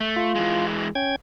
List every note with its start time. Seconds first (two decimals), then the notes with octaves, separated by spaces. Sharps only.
0.01 A3
0.16 F4
0.35 E3 G#3
0.95 C#4 G5 G#6